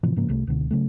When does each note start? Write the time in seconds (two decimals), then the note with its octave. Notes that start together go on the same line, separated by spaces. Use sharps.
0.03 A2 C3 E3 F3
0.16 G#2 C#3 F3 A#3
0.28 C2 C3 A3
0.47 C#2 B2 D3
0.71 C#3 F#3 A3